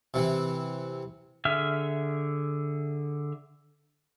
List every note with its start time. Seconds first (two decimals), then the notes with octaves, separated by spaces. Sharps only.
0.14 C3 E3
1.45 D3 G#4 E5 F6